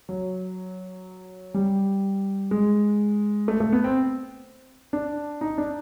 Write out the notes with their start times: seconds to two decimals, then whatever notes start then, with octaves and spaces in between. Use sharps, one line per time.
0.09 F#3
1.54 G3
2.51 G#3
3.48 A3
3.60 A3
3.72 B3
3.84 C4
4.93 D4
5.41 D#4
5.58 D4